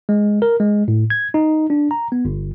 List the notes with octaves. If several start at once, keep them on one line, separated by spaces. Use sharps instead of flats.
G#3
A#4
G#3
A2
G#6
D#4
D4
A#5
B3
G1